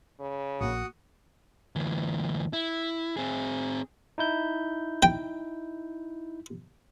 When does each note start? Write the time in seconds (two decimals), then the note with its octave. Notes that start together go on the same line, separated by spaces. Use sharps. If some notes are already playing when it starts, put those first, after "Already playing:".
0.20 C#3
0.61 A#1 A#2 F#4 C#6 D#6
1.76 D2 E3
2.53 E4
3.17 C4 G#4
4.18 D#4 E4 G6
5.03 G5